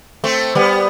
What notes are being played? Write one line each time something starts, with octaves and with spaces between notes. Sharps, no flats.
A3 C4
G3 B3